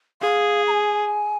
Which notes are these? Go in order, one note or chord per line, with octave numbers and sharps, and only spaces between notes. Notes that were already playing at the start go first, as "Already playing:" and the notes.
G#4 F5
A#5
G#5